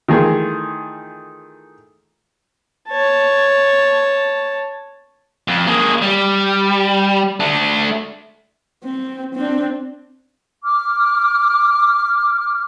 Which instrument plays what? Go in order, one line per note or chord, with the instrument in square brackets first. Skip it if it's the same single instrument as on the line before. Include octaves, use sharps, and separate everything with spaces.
[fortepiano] D#3 E3 A3 F4 G#4
[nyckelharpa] C#5 A5
[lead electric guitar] F2
A#3 G#4
G3
A3 D4
[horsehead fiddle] C4
C4 D4
[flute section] D6 F6